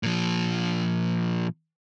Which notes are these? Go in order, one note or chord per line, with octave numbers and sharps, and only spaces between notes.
A#2 F3